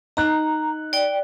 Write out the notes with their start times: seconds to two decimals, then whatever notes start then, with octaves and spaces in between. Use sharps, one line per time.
0.17 D#4 A#5 F#6
0.93 D5 G5